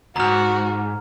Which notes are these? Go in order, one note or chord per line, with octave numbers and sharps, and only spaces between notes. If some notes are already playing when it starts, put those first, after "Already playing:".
D2 G#2 F#4 A#5 F6